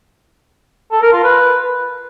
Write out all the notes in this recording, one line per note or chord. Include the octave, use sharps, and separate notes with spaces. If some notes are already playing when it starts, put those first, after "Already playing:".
A4
A#4
F4
B4